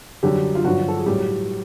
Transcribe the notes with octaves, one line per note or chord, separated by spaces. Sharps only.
F#2 D3 F#3 G3 G4
F4
G2 D3 F3 F#3 F#4
A4
G#4
A2 F#3 G3 G4